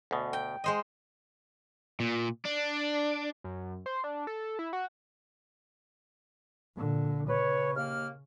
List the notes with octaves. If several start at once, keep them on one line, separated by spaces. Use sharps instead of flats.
D2 B2
G5
G#3 C5 D#5
A#2
D4
F#2
C5
D4
A4
E4
F#4
A#2 D3
C#3 B4 C#5
D#2 A#3 F6